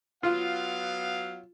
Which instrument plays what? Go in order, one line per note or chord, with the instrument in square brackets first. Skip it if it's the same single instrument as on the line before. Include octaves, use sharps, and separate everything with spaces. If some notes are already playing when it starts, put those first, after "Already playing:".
[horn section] F#3 B3 F5 [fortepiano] F4